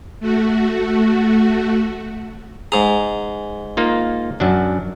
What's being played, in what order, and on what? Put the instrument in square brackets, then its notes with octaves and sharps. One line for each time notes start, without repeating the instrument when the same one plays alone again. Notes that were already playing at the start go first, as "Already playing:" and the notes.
[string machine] A3 F#4
[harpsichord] G#2 A#5 [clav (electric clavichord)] G#4
[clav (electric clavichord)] A#3 D#4 F4
F#2 F#3 D4